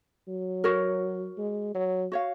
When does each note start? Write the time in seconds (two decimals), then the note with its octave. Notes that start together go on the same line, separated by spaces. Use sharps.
0.28 F#3
0.64 F#4 A#4 C#5
1.37 G#3
1.75 F#3
2.12 F#4 C#5 F5